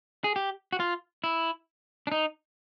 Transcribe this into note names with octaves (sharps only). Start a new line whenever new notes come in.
G#4
G4
F#4
F4
E4
D4
D#4